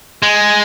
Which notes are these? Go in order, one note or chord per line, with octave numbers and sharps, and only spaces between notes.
G#3